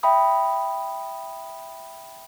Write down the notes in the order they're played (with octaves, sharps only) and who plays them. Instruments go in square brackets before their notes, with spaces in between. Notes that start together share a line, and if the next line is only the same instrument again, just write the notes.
[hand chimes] E5 G5 B5 D#6